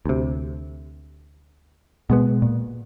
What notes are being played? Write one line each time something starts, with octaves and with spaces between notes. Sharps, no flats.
D2 C3
B2 G#3 B3
A#2